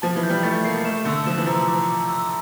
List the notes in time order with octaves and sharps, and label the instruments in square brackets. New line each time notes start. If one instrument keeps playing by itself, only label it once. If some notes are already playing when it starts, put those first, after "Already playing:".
[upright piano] F3 [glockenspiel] A5
[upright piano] E3
[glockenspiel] G6
[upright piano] G3
[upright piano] A3 [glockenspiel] A6
[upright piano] A#3 [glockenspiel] C7
[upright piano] A3 [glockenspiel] E7
[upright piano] D3 [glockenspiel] E6
[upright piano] F3 [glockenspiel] E7
[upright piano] E3
[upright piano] F3 [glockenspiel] A#5
[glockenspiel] D6
D6
E6